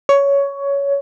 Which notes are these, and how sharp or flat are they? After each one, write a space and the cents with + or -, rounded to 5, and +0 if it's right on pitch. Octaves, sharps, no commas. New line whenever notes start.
C#5 +15